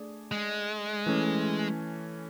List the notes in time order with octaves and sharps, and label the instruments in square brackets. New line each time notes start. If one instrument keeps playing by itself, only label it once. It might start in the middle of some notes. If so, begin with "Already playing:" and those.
Already playing: [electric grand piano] A3 D4 G#4 D5
[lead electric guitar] G#3
[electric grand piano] E3 A3 C#4